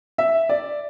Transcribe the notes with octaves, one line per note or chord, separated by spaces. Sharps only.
E5
D5